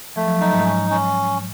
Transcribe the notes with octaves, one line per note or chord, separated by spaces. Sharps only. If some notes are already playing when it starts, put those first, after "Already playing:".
F3 A3
F#3
F3
F#3 D#4
G#2 G#3
C#4
C#4